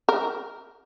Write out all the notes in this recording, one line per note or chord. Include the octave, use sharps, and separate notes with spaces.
A#4